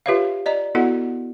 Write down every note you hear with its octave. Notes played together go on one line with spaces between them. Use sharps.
F4 G4 B4 C#5 E5 F5
D5 D#5 A#5
B3 E4 F#4 A4 D#5 F#5